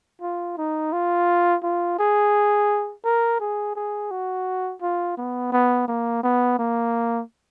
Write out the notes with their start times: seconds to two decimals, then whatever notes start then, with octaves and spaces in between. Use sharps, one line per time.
0.22 F4
0.57 D#4
0.93 F4
1.63 F4
1.99 G#4
3.05 A#4
3.40 G#4
3.76 G#4
4.11 F#4
4.82 F4
5.18 B3
5.52 B3
5.88 A#3
6.23 B3
6.59 A#3